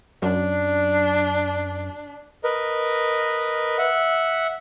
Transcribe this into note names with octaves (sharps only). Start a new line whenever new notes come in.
F#2 D4
A#4 B4 D#5
E5 F#5